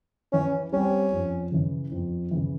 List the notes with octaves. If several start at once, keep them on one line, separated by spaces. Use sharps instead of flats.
E3 C#4
G3 C4 C#4
F2
C#3 E3
F2
C#3 E3